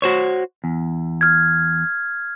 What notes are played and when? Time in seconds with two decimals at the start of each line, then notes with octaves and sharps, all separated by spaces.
0.02 F#4 C5 C#5
0.64 E2
1.21 F6 G#6